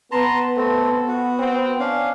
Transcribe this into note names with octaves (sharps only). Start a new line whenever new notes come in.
B3 B4 A5 A#5 C6
A3 C4 A4
F#4
C4
C#4 D4 F5